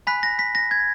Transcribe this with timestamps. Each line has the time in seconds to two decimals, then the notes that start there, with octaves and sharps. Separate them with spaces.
0.07 G#5 B5 F#6 B6
0.23 A#6
0.39 B6
0.55 A#6
0.71 G#6